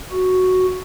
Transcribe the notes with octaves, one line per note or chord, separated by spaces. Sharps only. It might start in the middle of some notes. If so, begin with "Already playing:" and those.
F#4